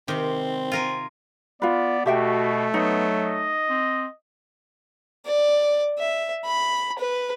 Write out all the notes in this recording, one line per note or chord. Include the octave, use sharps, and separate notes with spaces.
C3 D#3 C4 G4
F4 A#4 G#5
B3 F4 B4 D5
B2 A3 F#4 G4 E5 G5
F#3 B3 D#4
D#5
C4
D5
E5
B5
B4